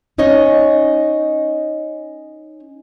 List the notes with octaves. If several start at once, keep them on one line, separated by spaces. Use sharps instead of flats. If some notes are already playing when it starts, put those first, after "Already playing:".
C#4 D#4 C#5 D#5